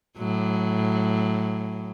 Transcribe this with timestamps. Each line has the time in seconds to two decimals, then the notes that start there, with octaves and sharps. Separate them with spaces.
0.18 A2 F#3